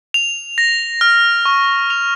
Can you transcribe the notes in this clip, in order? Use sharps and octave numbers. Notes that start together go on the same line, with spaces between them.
F7
A#6
F6
C#6
F7